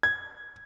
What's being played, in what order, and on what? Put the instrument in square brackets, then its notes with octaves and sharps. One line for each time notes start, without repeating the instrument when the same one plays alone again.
[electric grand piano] G#6